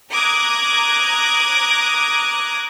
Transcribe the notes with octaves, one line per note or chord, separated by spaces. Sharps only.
A#5 D6 D#6 F#6 G#6